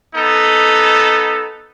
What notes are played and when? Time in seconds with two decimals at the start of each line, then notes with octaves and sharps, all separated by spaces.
0.15 B3 D#4 A4